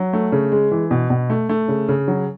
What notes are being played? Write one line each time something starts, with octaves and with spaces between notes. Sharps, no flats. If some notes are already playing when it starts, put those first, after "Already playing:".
Already playing: F#3
A3
C#3
G#3
E3
B2
B2
A3
A3
C#3
C#3
F#3